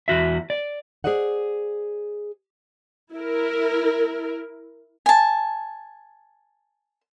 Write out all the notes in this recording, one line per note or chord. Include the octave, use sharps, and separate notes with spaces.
E2 F#4 E5
D5
G#4 C5 D5 D#5 F#5
E4 A#4
G#5 A5